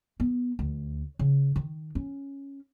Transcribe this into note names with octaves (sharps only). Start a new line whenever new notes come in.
B3
D2
C#3
D#3
C#4